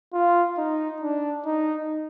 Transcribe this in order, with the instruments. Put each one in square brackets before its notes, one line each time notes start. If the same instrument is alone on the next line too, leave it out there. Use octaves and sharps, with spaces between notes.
[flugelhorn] F4
D#4
D4
D#4